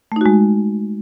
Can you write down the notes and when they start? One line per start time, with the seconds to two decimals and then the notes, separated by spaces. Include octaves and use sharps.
0.12 A3
0.16 D#4
0.21 F#4
0.26 G#3